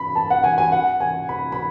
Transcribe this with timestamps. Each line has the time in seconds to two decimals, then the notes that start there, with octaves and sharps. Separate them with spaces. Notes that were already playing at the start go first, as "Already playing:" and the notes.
Already playing: B5
0.15 A5
0.30 F#5
0.44 G#5
0.58 G#5
0.72 F#5
1.00 G#5
1.29 B5
1.52 B5